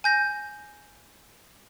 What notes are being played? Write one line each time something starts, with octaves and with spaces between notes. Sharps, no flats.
G#5 G6 A#6